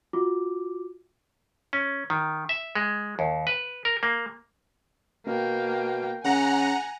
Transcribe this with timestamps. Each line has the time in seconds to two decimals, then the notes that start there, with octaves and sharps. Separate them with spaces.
0.13 F4 F#4 D6
1.73 C#4
2.10 D#3
2.49 E5
2.75 G#3
3.19 D#2
3.47 B4
3.85 A#4
4.03 A#3
5.27 B2 A#3 G5
6.24 C#3 F#5 G#5 A#5